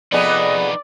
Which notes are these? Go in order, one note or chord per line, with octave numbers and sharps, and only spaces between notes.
F2 B3 D#4 G#4 B4 D5 D#5